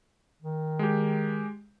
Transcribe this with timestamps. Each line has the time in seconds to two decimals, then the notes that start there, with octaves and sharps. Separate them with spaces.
0.42 D#3
0.79 G#3 G4